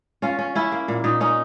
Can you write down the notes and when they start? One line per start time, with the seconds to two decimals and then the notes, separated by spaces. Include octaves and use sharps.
0.22 C#4 F4
0.39 C#4
0.55 C#4 E4
0.72 A#3
0.88 A#2
1.04 A#2 D#4
1.21 C#4 D#4